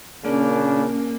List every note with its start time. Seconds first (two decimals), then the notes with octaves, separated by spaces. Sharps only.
0.25 A#2 C#3 A#3 C#4 D4